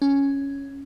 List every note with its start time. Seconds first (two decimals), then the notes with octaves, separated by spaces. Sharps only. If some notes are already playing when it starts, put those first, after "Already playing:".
0.02 C#4